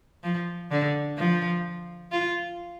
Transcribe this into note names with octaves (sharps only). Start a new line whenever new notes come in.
F3
D3
F3
F4